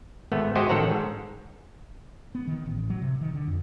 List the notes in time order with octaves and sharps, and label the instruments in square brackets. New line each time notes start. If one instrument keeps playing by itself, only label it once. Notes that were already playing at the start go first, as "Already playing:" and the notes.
[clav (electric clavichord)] G#1 A3 B3
G#3 F#4 G4 C5 D#5
A1 D#3 A4 C#5 F#5 A#5
G#2
[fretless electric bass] B3
D#3
A1
F#3
C3
D#3
D3
F2